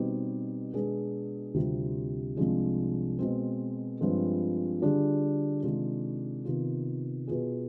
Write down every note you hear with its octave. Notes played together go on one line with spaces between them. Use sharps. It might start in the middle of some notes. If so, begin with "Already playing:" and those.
Already playing: B2 G3 C4 D#4 G4
B2 G#3 B3 D4 G#4
D2 C3 G3 C4 F4
C2 C3 F3 G#3 D4
B2 G#3 C4
G2 F3 G#3 C4 F4
D3 G3 D4 F4 G#4
C3 D#3 G#3 D4 F4
C3 D#3 B3 F4
B2 B3 F4 G#4